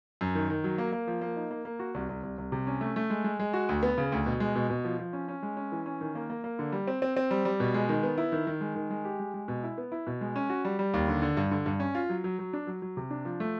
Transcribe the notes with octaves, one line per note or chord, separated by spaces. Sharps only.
F#2
D#3
D#3
F#3
A#3
A#3
F3
A#3
D#4
A#3
A#3
F#4
C2
C2
C2
C2
C3
C#4
A3
A3
G#3
G#3
G#3
F#4
D2
B3
C#3
D2
B2
G#3
B2
B2
F3
F3
C#4
C#4
G#3
C#4
E3
C#4
D#3
A#3
A#3
A#3
D3
G3
C4
C4
C4
G3
G3
B2
G#3
D#3
B3
E4
D#3
D#3
G#3
D#3
G#3
G4
G#3
G#3
B2
E4
B3
E4
B2
G#3
C#4
F#4
G3
G3
D#2
D3
D3
G2
D3
G2
C#4
F4
F#3
F#3
F#3
D4
F#3
F#3
C3
D4
F3
A3